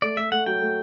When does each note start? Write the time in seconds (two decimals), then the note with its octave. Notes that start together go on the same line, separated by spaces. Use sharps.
0.02 A3 D5
0.17 A3 E5
0.31 A3 F#5
0.46 F#3 G5
0.61 A3